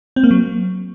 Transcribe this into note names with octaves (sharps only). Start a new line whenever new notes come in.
C4
A#3
F#3